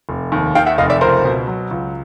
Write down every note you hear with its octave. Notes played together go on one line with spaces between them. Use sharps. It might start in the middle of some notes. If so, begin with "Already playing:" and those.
F1
D#2
D#3 F5 G5
E5 F#5
F1 D#5 F5
D5 E5
C#2 A#4 C5
B2
F#3
C#2